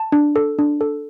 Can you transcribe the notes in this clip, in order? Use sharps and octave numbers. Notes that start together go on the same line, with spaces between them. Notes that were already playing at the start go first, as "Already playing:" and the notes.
Already playing: A5
D4
A4
D4
A4